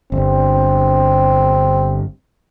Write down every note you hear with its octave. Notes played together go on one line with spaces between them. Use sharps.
G1 C4